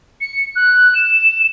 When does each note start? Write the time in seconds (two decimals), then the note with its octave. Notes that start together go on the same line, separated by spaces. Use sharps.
0.21 C#7
0.56 F#6
0.95 E7